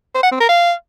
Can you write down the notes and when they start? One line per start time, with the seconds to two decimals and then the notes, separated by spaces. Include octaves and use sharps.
0.15 C5
0.23 F#5
0.32 C4
0.40 A#4
0.49 F5